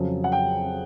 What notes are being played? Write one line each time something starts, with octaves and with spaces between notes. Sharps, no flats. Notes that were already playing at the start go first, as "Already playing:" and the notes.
Already playing: F2 C#3 F#3
F#5
G5